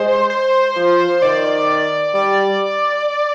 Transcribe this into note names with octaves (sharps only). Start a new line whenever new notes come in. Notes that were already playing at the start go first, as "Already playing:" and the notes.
Already playing: G#3 C5
C5
F3
D#3 D5
G3 D5